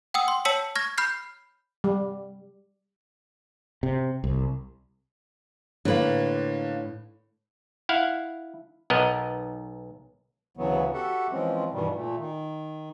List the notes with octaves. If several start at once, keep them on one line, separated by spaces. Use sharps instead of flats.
F#5 G5 D#6 E6
C6
C#5 A5 E6 B6 C#7 F#7
C#6 F6 G#6 A#6
B5 F6 G6 C7
G3
C3
C2
A2 D3 A#3 B4
E4 F5 F#5
B1 B3 A#4 D#5
D2 C#3 E3 F#3 B3
F#4 G4 A4 E5 F#5
E3 F3 G#3 C4 C#4
G2 B2 D#3 E3 G3
A#2 A3
D#3